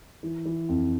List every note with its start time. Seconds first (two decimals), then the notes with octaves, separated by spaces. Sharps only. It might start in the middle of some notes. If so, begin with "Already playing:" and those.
0.23 E3
0.46 E3
0.69 F2